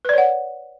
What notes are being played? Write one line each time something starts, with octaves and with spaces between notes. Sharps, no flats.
B4 C#5 D5 F#5